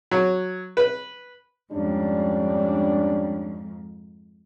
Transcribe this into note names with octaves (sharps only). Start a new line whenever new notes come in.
F#3
B4
F2 G#2 G3 C#4 D4